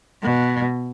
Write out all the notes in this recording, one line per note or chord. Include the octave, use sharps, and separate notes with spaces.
B2